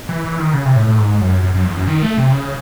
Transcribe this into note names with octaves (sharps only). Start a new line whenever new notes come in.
E3
E3
D#3
C#3
C3
A2
A2
G#2
F#2
F#2
F#2
E2
F#2
D#3
A3
C3
C#3